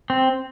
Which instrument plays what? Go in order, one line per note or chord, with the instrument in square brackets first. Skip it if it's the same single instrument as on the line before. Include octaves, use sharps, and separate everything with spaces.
[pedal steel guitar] C4